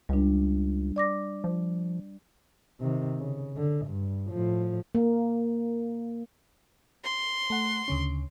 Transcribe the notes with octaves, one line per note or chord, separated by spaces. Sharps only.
C#2 G3 D4
D5 D6 A#6
F3
C3 D#3
C#3
D3
G2
A2 F3
A#3
C6
A3 F#5
D2 C#3 C#4